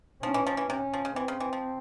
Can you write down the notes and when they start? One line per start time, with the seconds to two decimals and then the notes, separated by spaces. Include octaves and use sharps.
0.23 F3 C#4
0.34 E3
0.47 F3
0.57 E3
0.70 C3 C#4
0.94 F3
1.05 C#3
1.16 E3 C4
1.28 C#3
1.40 E3
1.53 F3